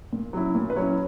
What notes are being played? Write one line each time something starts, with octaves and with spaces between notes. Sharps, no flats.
A#2
F#3 C#4 E4
A#2
B4
F#3 C#4 E4 C#5